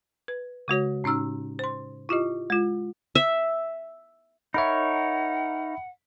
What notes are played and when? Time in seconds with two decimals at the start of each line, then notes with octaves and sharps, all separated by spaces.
0.28 B4
0.68 C#3 G#3 F#4 C#5
1.04 A2 C#4 D#4 E6 F6
1.59 C5 C6
2.09 E4 F4 G4 D#5
2.50 G#3 F4
3.15 E5
4.54 D#4 A#4 C#5 E5 F#5 B5